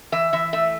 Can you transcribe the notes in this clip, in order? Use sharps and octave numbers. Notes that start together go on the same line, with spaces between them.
E3 E5
E3 E5
A3 E5